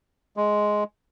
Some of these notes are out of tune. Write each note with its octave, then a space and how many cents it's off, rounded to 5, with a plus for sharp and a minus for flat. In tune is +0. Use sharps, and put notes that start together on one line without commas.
G#3 +5